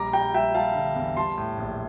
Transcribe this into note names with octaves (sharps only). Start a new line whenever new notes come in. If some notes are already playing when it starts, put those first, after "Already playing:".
Already playing: A#1 G3 A#5 D6
G3 G5 A#5
G3 E5 G5
G3 F5 A5
D3
E2
G3 A5 C6
A2
A#1